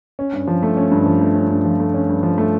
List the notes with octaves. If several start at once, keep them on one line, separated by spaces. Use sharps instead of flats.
C#4
G2
F3
A3
C#4
G2
F3
A3
C#4
G2
F3
A3
C#4
G2
F3
A3